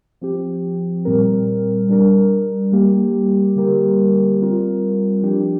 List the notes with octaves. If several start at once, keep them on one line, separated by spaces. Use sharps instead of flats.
F3 C4 G4
A#2 G3 C4 A#4
G3 D4 A#4
G3 A#3 G4
D3 G3 A#3 G4 A#4
G3 C4 F4 A#4
F3 D4 G4